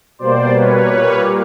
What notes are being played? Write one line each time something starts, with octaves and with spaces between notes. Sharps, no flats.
B2 G3 A#3 C5 D5
B4 C#5
A#2 G3 A#3